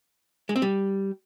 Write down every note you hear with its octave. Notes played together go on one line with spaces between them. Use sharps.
G#3
C4
G3